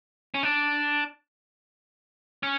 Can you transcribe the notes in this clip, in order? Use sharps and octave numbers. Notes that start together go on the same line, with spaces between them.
C#4
D4
C#4